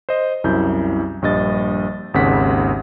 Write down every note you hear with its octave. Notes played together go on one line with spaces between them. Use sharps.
C5 D#5
C2 F#2 E4 G6
A#1 G2 D#5 A6
G#1 D#2 C#3 F#5 B6